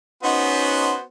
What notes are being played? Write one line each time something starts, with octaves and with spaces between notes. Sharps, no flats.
B3 C#4 D#4 F#4 C5